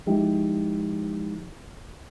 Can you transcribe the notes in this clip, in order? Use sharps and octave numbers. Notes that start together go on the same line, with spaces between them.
F3 G#3 D#4 E4 G4